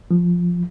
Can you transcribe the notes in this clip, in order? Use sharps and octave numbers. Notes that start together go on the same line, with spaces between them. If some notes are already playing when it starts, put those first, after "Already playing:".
F3